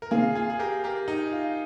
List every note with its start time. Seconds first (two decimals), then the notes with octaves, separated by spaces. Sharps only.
0.02 A#4
0.11 C3 D#3 A#3 F4 G#4
0.35 F4 G#4
0.50 G#4
0.59 G4 A#4
0.84 G4 A#4
1.08 D#4
1.33 F4